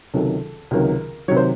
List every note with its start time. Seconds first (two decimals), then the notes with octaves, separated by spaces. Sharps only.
0.14 C#2 C3 D#3 F#3 A4
0.71 C#2 C3 D#3 F#3 A#4
1.28 C3 D#3 F#3 C#5
1.37 C5